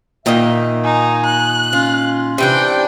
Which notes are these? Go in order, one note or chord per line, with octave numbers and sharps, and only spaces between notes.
A#2 D#3 A#3 D#5 E5 G5
D#4 G#5
F#6
C#4 F4
C3 E3 D4 G5